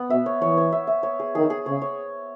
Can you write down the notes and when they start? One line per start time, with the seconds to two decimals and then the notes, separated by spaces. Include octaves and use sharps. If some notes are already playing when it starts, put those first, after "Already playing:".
Already playing: B3
0.09 B2 E5
0.26 C#5
0.41 E3 C#5
0.57 C#5
0.72 E5
0.87 E5
1.03 C#5
1.19 G#4
1.35 D#3 G#4
1.50 G#4
1.66 C#3 C#5
1.82 C#5